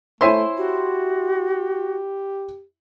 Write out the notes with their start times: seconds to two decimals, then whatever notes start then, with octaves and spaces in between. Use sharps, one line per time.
0.21 A3 E4 C5 C#5 E5 G#5 C6
0.57 F#4 G4